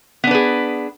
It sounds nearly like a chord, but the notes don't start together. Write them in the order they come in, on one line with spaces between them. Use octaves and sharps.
B3 D4 B4 G#4